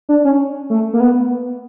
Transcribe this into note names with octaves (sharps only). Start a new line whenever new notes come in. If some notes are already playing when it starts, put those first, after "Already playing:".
D4
C#4
A3
A#3
B3